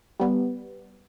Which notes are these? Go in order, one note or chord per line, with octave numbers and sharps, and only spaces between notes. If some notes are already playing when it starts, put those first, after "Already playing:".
G3 B3